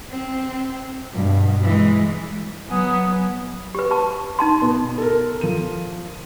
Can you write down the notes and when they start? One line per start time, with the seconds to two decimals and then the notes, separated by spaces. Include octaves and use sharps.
0.11 C4
1.13 G2 B2
1.63 E3 G#3
2.70 F#3 B3 F#5 G#5 D#6
3.75 G4 B4
3.91 B4 A5 C#6
4.39 D#4 A5 C6
4.62 B2 B3
4.98 A4 A#4
5.41 F3 D#7